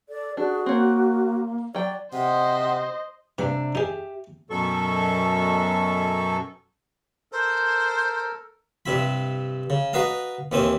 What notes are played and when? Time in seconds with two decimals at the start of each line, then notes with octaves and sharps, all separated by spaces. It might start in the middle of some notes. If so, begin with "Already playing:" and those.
0.09 A4 D5
0.37 D4 F#4 G#4
0.66 A#3 C4 C#5
1.75 F#3 D5 G5
2.13 C3 C5 D#5 F#5
3.38 G2 C3 A3 D4 B5
3.75 D#4 G4 G#4 E5
4.50 F#2 B2 F#3 A4 C#6
7.32 A4 A#4 C5
8.86 G2 C3 E4 B5
9.70 C#3
9.93 F#4 B4 D#5 F5 A#5
10.52 D#2 E3 C4 C#4 G#5